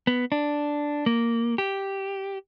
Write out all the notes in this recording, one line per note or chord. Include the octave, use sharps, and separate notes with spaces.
B3
D4
A#3
G4